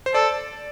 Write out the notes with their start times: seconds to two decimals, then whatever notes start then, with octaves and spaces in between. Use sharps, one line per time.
0.06 C5
0.14 A4 D5